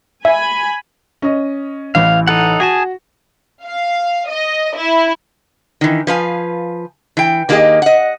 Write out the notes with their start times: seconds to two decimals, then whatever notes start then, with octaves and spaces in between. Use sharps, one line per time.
0.25 E5 G#5 B5
1.22 C#4 D#5
1.95 A1 E3 F5
2.27 D#4 A4 F#5
2.60 F#4 G#4 G#5 A5
3.65 F5
4.29 D#5
4.78 E4
5.81 D#3 E3
6.07 F3 B4 F5 G#5
7.17 E3 G5
7.49 D#3 A#3 D4 G4 G#4 D#5
7.82 D#5 F#5